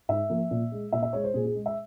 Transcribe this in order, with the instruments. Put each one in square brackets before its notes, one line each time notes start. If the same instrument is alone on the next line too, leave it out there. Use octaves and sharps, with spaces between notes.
[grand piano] G#2 E5
F3 A#3
A#2
G#3
A#2 E5
E5
G#3 C#5
C5
A#2 G#4
G#4
G#3
E5